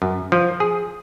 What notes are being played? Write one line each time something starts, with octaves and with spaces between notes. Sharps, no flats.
F#2
F3
G#4